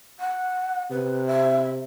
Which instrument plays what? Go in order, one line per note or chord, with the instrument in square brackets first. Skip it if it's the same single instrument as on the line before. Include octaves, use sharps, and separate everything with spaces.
[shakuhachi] F#5
[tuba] C3 [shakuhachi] B4
[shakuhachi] E5